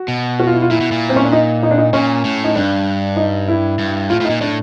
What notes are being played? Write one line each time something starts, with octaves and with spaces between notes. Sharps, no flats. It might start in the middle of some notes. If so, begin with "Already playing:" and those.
Already playing: F#4
B2
F#4
F4
E4
F4
A#2 E4
B2
A#2
C4
C#4
D4
D#4
D#4
D4
D#4
A#2 C#4
A2
D#4
G2 D4
D#4
E4
G2
A2 F4
A2
D#4
A#2
A2 D4